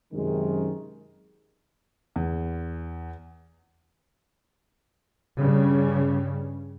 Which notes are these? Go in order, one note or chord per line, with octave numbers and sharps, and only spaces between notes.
F#2 C3 D#3 G#3
E2
G2 C#3 G3